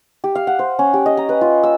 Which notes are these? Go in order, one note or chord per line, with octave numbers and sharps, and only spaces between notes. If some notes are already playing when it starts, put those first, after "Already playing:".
G4
F5
F#5
C5
C#4
G4
D#5
A#5
B4
F4
E6